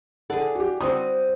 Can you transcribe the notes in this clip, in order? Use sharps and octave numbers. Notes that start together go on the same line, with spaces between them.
G#4 A4 D5 F#5
F#4 G4
G3 C4 F#4 D#6